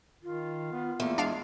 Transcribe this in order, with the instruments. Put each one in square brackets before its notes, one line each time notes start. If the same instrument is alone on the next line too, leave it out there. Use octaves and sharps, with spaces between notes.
[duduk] D#3 [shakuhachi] F4
[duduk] B3
[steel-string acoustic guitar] E2 A3 [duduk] A#3
[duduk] G#3 [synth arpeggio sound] D4 F5